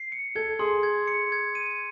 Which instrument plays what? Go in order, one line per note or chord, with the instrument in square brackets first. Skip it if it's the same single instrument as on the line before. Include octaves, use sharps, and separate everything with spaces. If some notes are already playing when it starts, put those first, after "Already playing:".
Already playing: [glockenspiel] C7
C#7
[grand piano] A4 [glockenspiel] G#6
[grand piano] G#4 [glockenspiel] C6
[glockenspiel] G#6
C#7
G#6
D#7